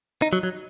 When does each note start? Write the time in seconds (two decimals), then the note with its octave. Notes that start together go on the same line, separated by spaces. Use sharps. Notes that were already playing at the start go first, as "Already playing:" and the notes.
0.22 D#4
0.33 F#3
0.43 F#3